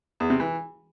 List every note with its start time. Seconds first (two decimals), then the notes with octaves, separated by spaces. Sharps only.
0.20 E2
0.30 C3
0.40 E3